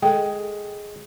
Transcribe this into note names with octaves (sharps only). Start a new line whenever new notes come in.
G#3 A4 G5